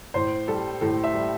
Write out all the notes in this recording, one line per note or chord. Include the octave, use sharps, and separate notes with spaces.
A2 C5
G3 A4
A2 A4
E5
G3